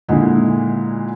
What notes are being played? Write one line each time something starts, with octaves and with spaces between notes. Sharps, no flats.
A#2 D3 G#3 D#4 E4